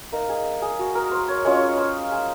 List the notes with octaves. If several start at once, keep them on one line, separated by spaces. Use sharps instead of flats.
A#3 D#4 A#4
G#4
G#4
F#4
A#4
C5
C#5
G#3 C#4 F4 C#5
C5
G#4